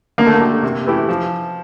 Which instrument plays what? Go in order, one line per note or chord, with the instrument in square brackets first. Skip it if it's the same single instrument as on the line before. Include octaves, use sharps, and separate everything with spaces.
[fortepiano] D3 [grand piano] A#3
[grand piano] A3
A#3
[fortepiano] A3 D4 G4
C3
E3 A3 E4 G4
F3